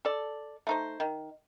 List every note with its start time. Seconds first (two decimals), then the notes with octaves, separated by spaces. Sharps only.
0.05 A4 D5
0.67 A3 D#4 C5
1.00 D#3